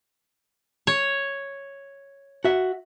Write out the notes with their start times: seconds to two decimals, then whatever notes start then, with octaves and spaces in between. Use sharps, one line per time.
0.87 C#5
2.45 F#4 E5